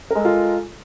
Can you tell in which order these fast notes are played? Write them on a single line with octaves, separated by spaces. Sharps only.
A#4 G#3 A4 F4